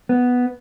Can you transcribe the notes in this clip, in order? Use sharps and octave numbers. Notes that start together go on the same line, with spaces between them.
B3